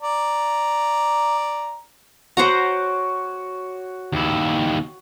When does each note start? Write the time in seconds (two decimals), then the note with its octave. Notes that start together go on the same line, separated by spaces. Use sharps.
0.02 D5 A#5
2.37 F#4 C5 C#5 F#5 A#5 D6
4.13 D#2 E4